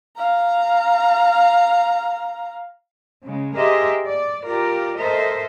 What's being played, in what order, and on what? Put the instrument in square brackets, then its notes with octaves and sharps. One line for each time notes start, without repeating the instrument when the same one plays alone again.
[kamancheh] F5 A#5
[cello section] C#3 G#3
G4 G#4 A#4 C5 D#5 E5
D5
F4 G4 A#4 D5
A4 A#4 C5 D#5 E5